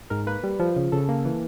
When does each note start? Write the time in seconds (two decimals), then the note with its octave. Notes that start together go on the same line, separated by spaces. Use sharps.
0.10 G#2 A#4
0.27 A#3 B4
0.43 G3
0.59 F3
0.76 C#3
0.92 C#3 A4
1.09 A#3
1.25 E3